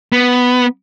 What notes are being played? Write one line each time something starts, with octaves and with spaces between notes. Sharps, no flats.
B3